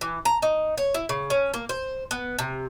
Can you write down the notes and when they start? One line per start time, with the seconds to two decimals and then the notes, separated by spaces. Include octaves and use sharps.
0.01 E3
0.25 A#5
0.42 D#4
0.78 C#5
0.94 E4
1.09 C#3
1.30 C#4
1.54 A#3
1.69 C5
2.11 B3
2.39 C3